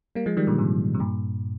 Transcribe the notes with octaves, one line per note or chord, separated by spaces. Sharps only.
G3 A#3
F3 G#3
D#3 G3
A#2 D3
G#2 C3
C3
G2 A#2